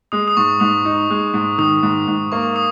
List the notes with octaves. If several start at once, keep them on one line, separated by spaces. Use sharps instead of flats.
G#3 D#6
D#6
G#2 C#6
G#2 D#6
D#4
G#3
G#2
D#3 D#6
G#2
G#2
A#3 C#6
D#6